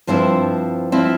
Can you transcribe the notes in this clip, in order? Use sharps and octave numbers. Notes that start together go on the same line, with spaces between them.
G2 F3 C4 E4 C5
F3 C4 E4